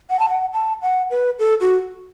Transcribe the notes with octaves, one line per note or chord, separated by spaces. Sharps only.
F#5
A5
F#5
A5
F#5
B4
A4
F#4